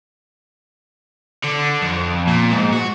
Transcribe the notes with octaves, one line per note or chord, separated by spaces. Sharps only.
D3
F2
A#2
G#2
F#4